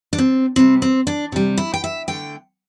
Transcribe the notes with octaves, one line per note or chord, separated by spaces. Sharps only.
D4
C4
C3 G3 C4
C4
D4
C3 G3
E4
G5
E5
D3 A3 G5